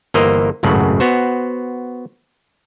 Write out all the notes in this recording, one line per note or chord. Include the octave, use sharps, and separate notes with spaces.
G1 E3 A#3 A#4 C5 D#5
G#1 C#2 F#2 A2 C#3 F#5
B3 F#4 C5